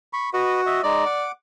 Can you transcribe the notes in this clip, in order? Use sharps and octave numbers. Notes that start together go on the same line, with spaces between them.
B5 C#6
F#4 B4 D#5
D#5 E5
G#3 D#4 D5 D#5
F#5 D6